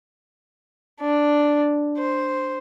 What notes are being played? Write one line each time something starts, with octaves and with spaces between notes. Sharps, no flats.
D4
C5